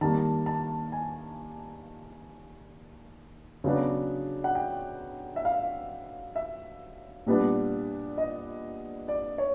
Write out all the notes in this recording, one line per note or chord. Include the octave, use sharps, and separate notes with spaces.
D#3 G3 A#3 A5
A5
G#5
C#3 F#3 B3 D4
F#5
G5
E5
F5
E5
A#2 G3 B3 D4
D#5
D5
C#5